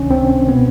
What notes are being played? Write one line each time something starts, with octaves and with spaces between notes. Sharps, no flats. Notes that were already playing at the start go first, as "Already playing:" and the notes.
Already playing: C#2 C3 D#3 C#4 D4
C4
B2 B3